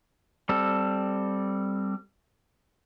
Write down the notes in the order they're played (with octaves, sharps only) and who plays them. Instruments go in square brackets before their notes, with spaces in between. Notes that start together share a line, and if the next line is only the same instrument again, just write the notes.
[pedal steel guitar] G3 C4 A4